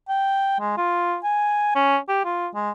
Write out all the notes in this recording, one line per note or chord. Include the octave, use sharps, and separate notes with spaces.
G5
G#3
F4
G#5
C#4
G4
F4
G#3